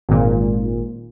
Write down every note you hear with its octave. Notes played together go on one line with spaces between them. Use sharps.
G#1 A#2